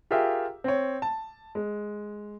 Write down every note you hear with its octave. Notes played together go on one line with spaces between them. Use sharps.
F4 G4 G#4 A#4 E5 F5
C4 C#5
A5
G#3